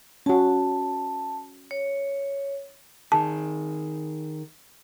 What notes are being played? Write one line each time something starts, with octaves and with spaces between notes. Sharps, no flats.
C#4 F#4 A5
C#5
D#3 G#4 A5